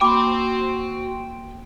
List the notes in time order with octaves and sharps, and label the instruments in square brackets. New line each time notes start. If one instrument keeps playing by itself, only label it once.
[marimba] A#3 B5 [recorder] F#4 [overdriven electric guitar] G5 C6 [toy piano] D6